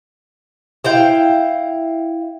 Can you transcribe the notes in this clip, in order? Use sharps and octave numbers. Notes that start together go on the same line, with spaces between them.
E4 F5 G5